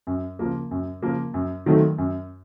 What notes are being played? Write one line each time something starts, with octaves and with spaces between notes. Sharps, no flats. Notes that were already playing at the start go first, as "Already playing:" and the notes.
F#2
C#3 F3 A#3
F#2
C#3 F3 A#3
F#2
D#3 F#3 A3 C4
F#2